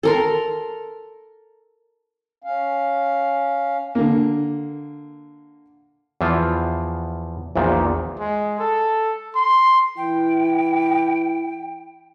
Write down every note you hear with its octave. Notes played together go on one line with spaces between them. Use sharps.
A4 A#4 C6
C#4 F5
D3 A#3
E2 E3 F3 F4
A#1 E2 A#2 D#3
G#3
A4
C6
E3 E4 G5